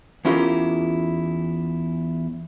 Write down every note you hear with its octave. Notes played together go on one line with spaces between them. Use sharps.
E2 C#4 E4 F4 G4 A#4